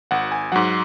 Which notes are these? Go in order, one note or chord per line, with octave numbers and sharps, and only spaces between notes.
G#1 F#5
G#5
G#2 F#3 F#5